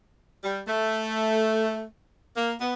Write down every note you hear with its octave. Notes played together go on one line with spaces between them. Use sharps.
G3
A3
A#3
B3